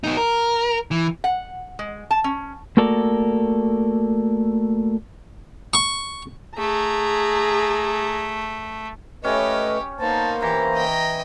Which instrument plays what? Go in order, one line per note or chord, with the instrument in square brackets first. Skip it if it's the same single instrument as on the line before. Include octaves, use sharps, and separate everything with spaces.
[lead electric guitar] B3 D#4
A#4
E3
[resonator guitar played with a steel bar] F#5
G#3
A5
C#4
[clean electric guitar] A3 A#3 F#4 A4 A#4 D5
[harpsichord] C#6
[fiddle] A3 [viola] G#4 A#5
[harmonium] A3 B4 D#5 [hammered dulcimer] C#4 [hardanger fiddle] G4 C#5
[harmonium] A#3 C5 [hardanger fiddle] B3 D#4 [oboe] A5
[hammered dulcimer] E3 [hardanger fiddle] G4 [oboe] A#5
[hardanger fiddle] D#5 G5